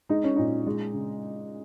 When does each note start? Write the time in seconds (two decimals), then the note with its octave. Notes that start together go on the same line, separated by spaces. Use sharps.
0.09 G#3 D#4
0.24 C#4
0.36 A#2 D#4
0.67 G#3
0.94 C#3